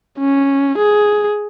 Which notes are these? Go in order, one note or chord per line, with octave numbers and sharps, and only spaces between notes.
C#4
G#4